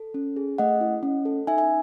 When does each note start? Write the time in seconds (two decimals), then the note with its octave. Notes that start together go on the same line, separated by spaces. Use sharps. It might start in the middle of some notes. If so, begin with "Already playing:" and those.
Already playing: A4
0.14 C#4
0.36 G#4
0.58 A3 D#5 F#5
0.81 E4
1.03 C#4
1.25 A4
1.47 D#4 E5 G#5
1.58 E5 G#5